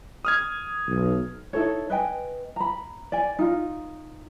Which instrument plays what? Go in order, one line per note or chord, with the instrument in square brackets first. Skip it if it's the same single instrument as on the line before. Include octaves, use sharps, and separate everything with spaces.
[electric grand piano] D#6 F6 G#6
[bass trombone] B1
[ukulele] D#4 E4 A4 C#5
B4 D#5 G5 G#5
A#5 B5
D5 G#5
D#4 F4